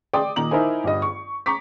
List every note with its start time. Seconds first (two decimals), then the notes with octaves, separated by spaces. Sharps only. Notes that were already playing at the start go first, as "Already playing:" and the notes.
0.14 D5 G5 C6 D6 D#6
0.36 A#2 D#3 A#5 F#7
0.51 D#4 E4 A#4 C5 G#5
0.84 G1 G2 D#5
1.02 C#6
1.46 A#5 C#6 D6 B6